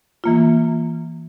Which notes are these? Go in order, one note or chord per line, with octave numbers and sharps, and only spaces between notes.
E3 A#3 F4